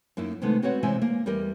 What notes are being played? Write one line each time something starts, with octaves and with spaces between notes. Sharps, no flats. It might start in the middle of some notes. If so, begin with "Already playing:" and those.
F#2 A#3 D#4 E4
C3 D#3 G#3 A3 B3
C4 F#4 B4 C#5 F#5
C3 E3 G#3 C4 E5 G#5
A#3
E2 G3 G4 A#4 D#5